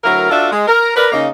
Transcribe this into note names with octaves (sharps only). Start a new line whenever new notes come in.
D2 F#3 E4 A#4
D4 F4 F#4 A4 D5 E5
G#3
A#4
A#4 B4 D5
C#3 A#3 D#4